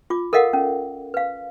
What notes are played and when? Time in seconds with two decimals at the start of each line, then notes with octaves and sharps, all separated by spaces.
0.10 F4 D6
0.33 A4 A#4 D#5 F5 F#5
0.53 C#4
1.14 B4 F5